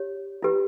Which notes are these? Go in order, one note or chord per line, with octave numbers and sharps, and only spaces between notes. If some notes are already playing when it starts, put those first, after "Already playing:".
Already playing: G4 C#5
E4 G4 B4